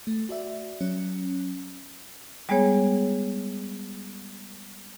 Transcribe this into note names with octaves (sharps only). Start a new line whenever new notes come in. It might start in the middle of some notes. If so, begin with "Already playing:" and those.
A3
F#4 D5 E5
F#3 C#4
G3 G#3 B3 G#4 C#5